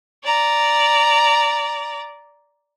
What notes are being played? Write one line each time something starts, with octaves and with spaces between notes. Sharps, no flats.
D5 A#5